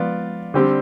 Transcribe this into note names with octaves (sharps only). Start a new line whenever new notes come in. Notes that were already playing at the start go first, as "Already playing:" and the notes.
Already playing: F3 G#3 B3 F4 B4 D5
D3 G3 C4 G4